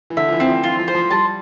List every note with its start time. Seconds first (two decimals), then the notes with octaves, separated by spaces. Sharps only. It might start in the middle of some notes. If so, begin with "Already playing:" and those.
0.10 E3
0.17 D3 E5
0.28 F3
0.32 E3
0.40 C4
0.48 F3
0.63 E3 F4
0.79 F3
0.88 C5
0.95 F3
1.11 G3 A5